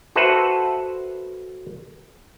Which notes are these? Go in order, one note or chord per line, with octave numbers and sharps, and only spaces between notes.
F#4 A4 B4 C5 E5 F#5